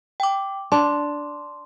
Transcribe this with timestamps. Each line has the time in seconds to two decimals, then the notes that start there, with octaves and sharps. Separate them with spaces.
0.20 G5 D6
0.72 D4 C6